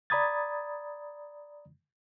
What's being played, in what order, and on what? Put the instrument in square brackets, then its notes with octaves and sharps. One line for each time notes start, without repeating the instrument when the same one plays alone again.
[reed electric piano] D5 A#5 B5 D#6 G#6 A6